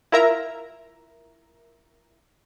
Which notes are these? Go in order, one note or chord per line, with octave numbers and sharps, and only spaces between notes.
E4 F4 A#4 E5 A#5